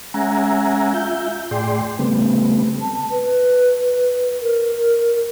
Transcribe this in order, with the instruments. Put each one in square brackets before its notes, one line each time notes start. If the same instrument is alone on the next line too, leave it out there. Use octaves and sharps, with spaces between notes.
[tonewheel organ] G#3 C#4 E5 F#5 G#5 A#5
F4 E5 G6
A2 G#4 D5 G5 C6
C#3 G3 A3 B3 C4
[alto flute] A5
B4
A#4